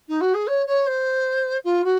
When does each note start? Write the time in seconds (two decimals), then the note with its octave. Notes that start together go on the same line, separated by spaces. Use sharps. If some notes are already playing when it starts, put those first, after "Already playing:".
0.08 D#4
0.21 F#4
0.34 G#4
0.47 C#5
0.67 C#5
0.87 C5
1.64 F4
1.84 F#4